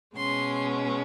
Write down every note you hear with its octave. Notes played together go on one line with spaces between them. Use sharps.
B2 G#3 C#4 C6